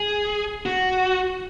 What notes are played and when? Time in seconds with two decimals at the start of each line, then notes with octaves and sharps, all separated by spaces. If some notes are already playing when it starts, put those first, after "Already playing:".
Already playing: G#4
0.66 F#4